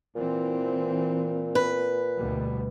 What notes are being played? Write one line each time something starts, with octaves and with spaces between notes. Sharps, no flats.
A#2 E3 C4
B4
D2 B2 G3